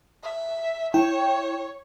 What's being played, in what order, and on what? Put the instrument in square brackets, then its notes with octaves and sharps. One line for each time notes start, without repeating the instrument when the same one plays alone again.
[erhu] E5
[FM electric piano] E4 G5 [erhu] C#5